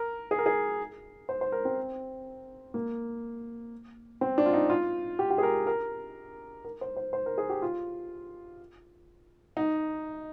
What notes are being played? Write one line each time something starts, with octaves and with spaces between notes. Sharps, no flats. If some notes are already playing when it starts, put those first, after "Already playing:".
Already playing: A#4
G#4
A#4
G#4
C5
C5
A#4
C4
A#3
C4
D4
F4
D#4
F4
G4
G4
G#4
A#4
A#4
A#4
C5
C5
C5
A#4
G#4
G4
F4
D#4